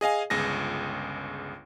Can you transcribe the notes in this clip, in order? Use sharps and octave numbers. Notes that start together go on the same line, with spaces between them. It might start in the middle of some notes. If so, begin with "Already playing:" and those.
G#4 D#5 F5 G#5
G1 C#2 G#4 A#6